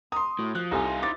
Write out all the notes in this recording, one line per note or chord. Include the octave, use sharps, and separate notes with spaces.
A#5 C6 D#6
A2 F#4
F3 F#6
C2 D#4 F4 A4 G#5
E4 C5 E5 D6 A6